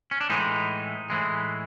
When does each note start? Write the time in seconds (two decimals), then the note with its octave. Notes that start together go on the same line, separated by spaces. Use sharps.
0.11 C#4
0.21 D4
0.30 A2 E3 G#3 D#4
1.10 A2 E3 G#3